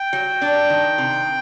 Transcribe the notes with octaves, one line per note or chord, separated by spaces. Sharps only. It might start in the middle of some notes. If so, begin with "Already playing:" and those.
Already playing: G5
F#3
D4
D#3
C3